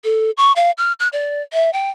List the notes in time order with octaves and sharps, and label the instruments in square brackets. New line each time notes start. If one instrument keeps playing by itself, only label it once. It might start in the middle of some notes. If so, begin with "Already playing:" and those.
[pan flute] A4
C#6
F5
F6
F#6
D5
E5
G5